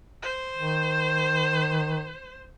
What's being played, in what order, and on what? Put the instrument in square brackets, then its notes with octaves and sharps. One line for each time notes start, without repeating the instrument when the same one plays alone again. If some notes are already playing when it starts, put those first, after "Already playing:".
[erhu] C5
[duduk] D#3